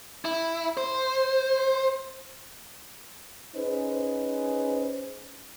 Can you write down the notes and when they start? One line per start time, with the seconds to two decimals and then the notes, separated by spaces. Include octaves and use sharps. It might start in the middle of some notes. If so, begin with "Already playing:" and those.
0.25 E4
0.77 C5
3.56 C#4 D#4 G#4 B4 C5